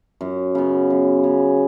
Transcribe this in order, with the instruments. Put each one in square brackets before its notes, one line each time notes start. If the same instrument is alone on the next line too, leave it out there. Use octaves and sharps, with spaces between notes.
[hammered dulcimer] F#2
C#3 B3
F#2
C#3 B3